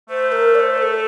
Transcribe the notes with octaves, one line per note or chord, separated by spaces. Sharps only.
A3 C5
A#4
D5
C5
A#4
A4